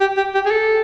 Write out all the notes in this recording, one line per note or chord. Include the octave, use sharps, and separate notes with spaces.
G4
G4
G4
G#4
A4